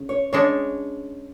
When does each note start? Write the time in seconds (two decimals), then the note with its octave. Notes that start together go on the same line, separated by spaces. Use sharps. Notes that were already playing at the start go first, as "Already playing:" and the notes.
Already playing: C#3
0.09 C#5
0.33 C#3 G#3 D4 C#5